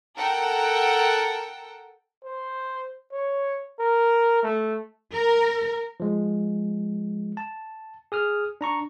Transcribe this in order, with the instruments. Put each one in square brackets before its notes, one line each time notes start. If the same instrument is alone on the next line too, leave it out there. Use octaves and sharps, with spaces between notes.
[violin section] A4 A#4 F#5 G5 A5
[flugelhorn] C5
C#5
A#4
A3
[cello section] A#4
[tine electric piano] F3 G#3
A5
G#4 D#6 F6
D4 A#5 C#6